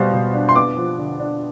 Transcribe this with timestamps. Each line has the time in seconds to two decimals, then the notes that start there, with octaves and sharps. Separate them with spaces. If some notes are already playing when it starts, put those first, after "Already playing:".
Already playing: B2 G3 B3 C5 F5
0.13 B2
0.34 D4
0.49 C6
0.55 B3 D6
0.77 F3
0.98 D3
1.20 D4